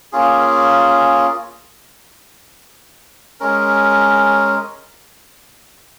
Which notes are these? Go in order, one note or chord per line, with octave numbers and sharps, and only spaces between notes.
A#3 C#4 F4 G#4
G#3 C#4 A#4